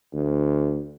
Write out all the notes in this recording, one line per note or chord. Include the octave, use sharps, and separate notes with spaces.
D2